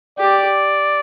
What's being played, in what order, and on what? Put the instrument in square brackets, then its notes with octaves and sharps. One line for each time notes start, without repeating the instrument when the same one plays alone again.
[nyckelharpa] G4 [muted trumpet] D5